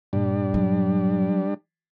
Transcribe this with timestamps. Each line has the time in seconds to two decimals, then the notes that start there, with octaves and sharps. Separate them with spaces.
0.13 G2 A#2 G3 D4
0.54 F#3